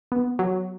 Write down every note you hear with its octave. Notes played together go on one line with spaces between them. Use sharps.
B3
F#3